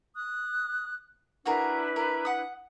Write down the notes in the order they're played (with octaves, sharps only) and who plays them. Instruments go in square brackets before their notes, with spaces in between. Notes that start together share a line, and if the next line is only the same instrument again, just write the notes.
[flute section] D#6 F#6
[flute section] D4 E4 B4 [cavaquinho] F#4 G#4 A#4
[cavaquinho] A#4
F#5 D#6